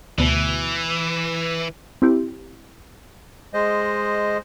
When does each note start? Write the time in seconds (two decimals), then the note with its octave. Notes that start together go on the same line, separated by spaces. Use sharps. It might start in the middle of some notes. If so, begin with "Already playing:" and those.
0.18 D2 B2 E3
2.02 C4 E4 G4
3.54 G#3 C5 D#5